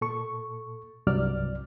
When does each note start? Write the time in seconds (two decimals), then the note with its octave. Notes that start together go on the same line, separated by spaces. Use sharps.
0.01 A#2 A4 C#6
1.07 C2 G2 C3 F#3 D5 F6